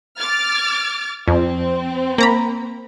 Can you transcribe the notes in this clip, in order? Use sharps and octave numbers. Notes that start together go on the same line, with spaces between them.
D6 F6 A6
F2 C4
A#3 A#5 B5